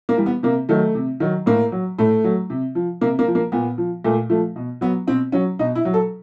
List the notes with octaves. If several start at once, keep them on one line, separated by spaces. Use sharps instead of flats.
A#3
E3 G3
B3
C3 A#3
D#3 F#3 A3
C3
D#3 F#3
A2 A#3
F#3
A2 A3
F#3
C3
F3
C3 A#3
A#3
F3
A#3
A#2 B3
F3
A#2 A3
F3 A3
B2
F#3 B3
B2 C4
F#3 C#4
B2 D#4
E4
F#3
A4